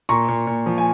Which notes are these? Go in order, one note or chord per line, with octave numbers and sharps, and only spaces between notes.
A#2 A#5 C#6
A#2
A#2
F3
G#5